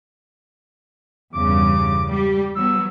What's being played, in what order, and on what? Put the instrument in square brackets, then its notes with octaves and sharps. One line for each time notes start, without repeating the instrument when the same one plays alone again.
[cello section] E2 G2 C#3 [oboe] D6
[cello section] G3 G4
[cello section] F#3 G3 B3 [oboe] E6